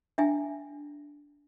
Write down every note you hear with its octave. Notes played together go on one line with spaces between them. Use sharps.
D4 E4 E5 G5 G#5